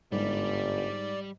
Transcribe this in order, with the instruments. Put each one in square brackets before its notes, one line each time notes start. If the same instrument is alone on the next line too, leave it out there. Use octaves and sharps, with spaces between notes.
[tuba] G1 [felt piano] G#2 [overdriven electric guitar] G3 [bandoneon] D5